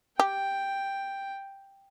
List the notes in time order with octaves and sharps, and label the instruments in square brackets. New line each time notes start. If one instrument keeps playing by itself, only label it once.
[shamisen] G4 [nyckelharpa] G5